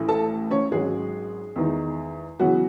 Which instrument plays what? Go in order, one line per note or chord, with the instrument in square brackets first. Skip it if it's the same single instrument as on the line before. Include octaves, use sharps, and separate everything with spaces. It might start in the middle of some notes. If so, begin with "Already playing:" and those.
Already playing: [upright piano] A1 A2 E3 A3
A4 A5
C#4 C#5
G#1 G#2 F#3 G#3 C#4 G#4
E2 D#3 G#3 D#4
C#3 E3 F#3 B3 F#4